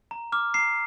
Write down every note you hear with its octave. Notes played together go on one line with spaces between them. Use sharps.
A#5
D6 F6
A#5 C7